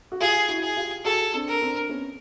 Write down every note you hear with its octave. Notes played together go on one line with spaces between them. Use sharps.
F#4
F4 G4 G#4
E4 F#4
G#4
F4 G4
F#4 G#4 A4
C4 D4
A#4
C4 D4
B3 C#4